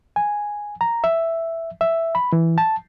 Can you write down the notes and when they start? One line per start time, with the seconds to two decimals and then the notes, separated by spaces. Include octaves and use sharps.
0.16 G#5
0.81 A#5
1.04 E5
1.81 E5
2.15 B5
2.32 E3
2.58 A5